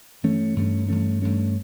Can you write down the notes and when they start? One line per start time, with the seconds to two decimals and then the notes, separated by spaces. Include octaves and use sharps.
0.23 G2 E3 A3 C#4
0.56 G2 E3 A3 C#4
0.88 G2 E3 A3 C#4
1.22 G2 E3 A3 C#4